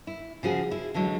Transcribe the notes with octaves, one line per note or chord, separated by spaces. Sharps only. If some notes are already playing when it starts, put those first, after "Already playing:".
E4
C#3 F3 F#4 G#4
E4
D3 E3 F#3 G#3